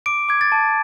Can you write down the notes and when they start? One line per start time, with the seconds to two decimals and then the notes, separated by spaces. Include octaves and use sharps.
0.06 D6 D7
0.29 D6 G#6
0.41 A6
0.52 A5